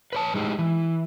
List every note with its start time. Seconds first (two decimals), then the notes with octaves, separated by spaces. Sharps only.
0.13 B4 C#5 A5
0.34 A2 G#3 D#4 G4
0.59 E3